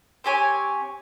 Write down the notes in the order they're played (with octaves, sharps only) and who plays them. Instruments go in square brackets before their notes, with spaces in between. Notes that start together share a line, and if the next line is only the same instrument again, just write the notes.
[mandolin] C4 G4 C#5 G#5